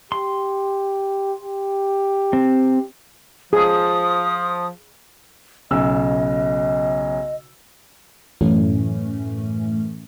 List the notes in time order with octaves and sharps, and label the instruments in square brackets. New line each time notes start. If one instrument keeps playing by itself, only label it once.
[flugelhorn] G4 [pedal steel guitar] C6
[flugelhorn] G4
[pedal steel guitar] C4
[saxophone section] F3 [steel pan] G#4 [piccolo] D#6
[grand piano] B1 C#3 E6 [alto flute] D#5
[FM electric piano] F#2 A2 E3 A3 C#4